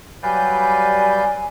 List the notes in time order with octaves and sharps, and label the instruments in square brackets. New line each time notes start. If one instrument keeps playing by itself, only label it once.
[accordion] F#3 G3 G6 [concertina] B4 D5 F5 [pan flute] G#5